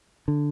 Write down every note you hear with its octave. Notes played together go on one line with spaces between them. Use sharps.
D3